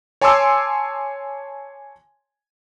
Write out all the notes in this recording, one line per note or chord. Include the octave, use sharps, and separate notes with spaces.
C#5 G#5 A5 C6 D6 E6